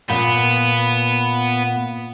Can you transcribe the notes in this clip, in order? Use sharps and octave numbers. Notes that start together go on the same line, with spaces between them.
A#2 B3